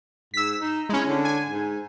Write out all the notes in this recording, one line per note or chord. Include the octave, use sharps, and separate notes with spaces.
G#2 E6 B6
D#4
G#3 C#4 E4
D3
G#5
G#2